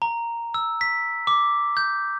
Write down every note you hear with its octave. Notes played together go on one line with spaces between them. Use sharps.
A#5
E6
B6
D6
G6